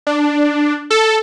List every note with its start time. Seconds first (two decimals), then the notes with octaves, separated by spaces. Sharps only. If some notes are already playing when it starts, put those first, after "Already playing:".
0.07 D4
0.90 A4